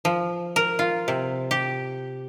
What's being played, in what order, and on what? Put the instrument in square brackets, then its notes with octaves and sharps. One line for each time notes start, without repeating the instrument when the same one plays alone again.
[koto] F3
A#4
F4
C3
G4